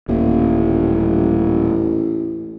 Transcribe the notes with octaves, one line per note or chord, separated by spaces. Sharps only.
D#1 A1 A#3